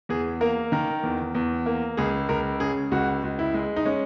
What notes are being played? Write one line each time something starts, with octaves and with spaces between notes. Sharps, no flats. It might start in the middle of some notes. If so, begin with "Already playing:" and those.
E2 G#4
A#3 A#4
D#3 A#4
E2
E2
A#3
C#2 G#4
C#2 A#4
C#3 G#4
C#2 F#4
C#2
E4
G#3
D#4
G#3 C#4